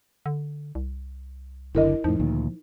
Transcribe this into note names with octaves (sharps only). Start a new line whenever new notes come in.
D3
C2
F#1 B2 D3 E4 A#4 D#5
F2 A2 F3 D#4
D2 A#2 D#3